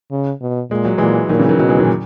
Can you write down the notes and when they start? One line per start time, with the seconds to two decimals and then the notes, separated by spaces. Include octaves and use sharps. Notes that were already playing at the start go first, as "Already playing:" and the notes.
0.11 C#3
0.41 B2
0.71 A#2 G#3
0.85 F#3
0.98 A#2 E3 G#3
1.29 A#2 D#3 F#3
1.39 C#3 E3
1.49 D#3 F#3
1.59 B2 D#3 F#3
1.69 E3 G#3
1.79 D#3 F#3
1.85 A#2